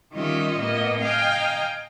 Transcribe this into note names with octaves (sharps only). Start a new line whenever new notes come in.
D#3 G3 C#4 F4 D#5 E5
A2 A#3 B3 D#5
D#5 F5 G5 G#5 A#5